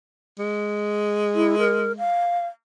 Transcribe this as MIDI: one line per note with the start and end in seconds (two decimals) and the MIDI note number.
0.39 2.10 56
1.35 1.56 64
1.59 1.92 70
1.98 2.46 77